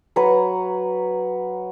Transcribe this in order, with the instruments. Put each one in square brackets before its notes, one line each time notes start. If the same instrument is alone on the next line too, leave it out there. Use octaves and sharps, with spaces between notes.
[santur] F#3 B4 C#5 A#5